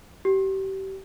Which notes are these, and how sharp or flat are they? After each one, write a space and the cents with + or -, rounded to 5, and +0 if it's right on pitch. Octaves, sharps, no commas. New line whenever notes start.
G4 -30